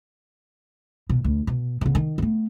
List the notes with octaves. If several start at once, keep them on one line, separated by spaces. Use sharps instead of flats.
B2
D2
B2
C#3 B3
D#3
A3 B3